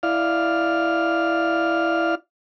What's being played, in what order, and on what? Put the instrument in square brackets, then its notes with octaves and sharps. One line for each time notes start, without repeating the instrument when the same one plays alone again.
[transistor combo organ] E4 D5 F5 F6